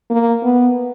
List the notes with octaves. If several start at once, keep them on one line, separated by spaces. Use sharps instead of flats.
A#3
B3